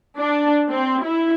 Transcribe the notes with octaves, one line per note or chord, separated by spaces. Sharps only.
D4
C4
E4